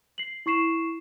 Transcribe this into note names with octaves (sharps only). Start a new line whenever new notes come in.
C7 F#7
E4 C#6 C7 E7